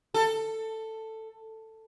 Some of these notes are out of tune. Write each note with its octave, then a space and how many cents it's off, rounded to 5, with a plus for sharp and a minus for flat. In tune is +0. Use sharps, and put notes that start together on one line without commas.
A4 +10